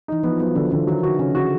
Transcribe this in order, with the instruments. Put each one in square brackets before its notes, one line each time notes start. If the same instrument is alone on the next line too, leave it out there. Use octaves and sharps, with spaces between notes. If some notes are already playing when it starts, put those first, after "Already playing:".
[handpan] E3 [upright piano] D#4
[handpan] F3 [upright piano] B3
[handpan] F#3 [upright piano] B3
[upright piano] D3 [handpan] F3
[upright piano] D3 [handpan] E3
[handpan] D#3 [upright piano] F#3
[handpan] D3 [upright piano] F#4
[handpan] C#3 [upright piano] C#4
[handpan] D3 [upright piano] F#4